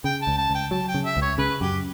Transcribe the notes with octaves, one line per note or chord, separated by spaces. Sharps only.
C#3 G5
A5
C#2
A5
C#2
G5
F#3 A5
G5
C#3
E5
C#2
C#5
C#3 B4
F#2 G4